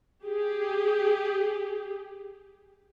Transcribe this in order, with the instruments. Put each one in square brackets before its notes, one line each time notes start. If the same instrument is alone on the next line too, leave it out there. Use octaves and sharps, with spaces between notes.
[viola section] G4 G#4